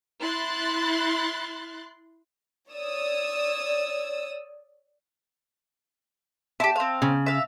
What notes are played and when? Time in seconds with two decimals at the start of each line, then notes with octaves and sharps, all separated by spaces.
0.21 E4 C6 F#6 A6
2.72 C#5 D5 D#6 E6
6.60 E4 G4 A5
6.76 C4 F5
7.02 C#3
7.26 E5 F5